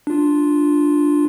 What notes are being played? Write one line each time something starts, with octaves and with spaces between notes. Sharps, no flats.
D4 F4